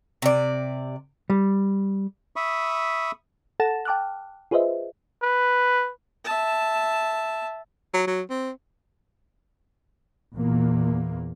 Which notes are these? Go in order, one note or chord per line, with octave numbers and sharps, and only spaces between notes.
C3 D5
G3
E5 B5 C#6 D#6
A4 F#5 A5 A6 A#6 E7
G5 A5 D6 F6 F#6
F4 G#4 B4 C5 D#5 E5
B4
E5 A5
F#3
F#3
C4
E2 A#2 A#3